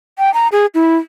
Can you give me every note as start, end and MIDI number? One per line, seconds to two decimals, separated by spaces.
0.19 0.33 79
0.34 0.48 82
0.52 0.66 68
0.75 0.96 64